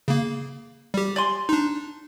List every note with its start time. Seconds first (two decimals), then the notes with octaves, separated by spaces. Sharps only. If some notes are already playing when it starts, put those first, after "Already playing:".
0.08 C#3 A#3
0.94 G3 G4
1.16 D5 G#5 C6
1.49 D4 D#4